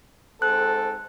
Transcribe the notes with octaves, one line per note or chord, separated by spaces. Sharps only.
G#2 C4 A4 F#6